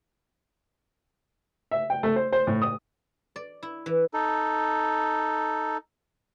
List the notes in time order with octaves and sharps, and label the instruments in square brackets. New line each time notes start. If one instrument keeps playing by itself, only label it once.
[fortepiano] E5
G5
A3
C5
C5
A2
D#6
[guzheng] D5
E4
E3
[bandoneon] D#4 A4